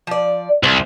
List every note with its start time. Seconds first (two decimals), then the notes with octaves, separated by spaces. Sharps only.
0.07 F3 D5
0.63 C2 C5